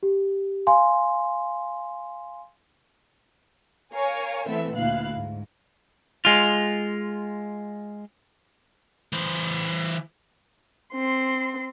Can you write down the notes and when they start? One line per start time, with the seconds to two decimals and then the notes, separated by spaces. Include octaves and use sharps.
0.03 G4
0.67 F5 G#5 C6
3.94 A#4 C#5 F5 G#5
4.46 E3 A3 B3 C4 A4 E5
4.76 D2 A#2 E4 F5 F#6
5.14 G#2
6.25 G#3 F4
9.13 E3 C5
10.94 C4 C6